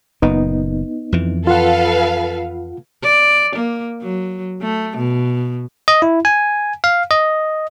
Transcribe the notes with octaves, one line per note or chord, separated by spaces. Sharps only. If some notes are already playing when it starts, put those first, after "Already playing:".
F#1 A#2 B3 D#4
F2 E3
F4 A4 B4 F5 F#5
D5
A#3
F#3
A3
B2
D#5
E4
G#5
F5
D#5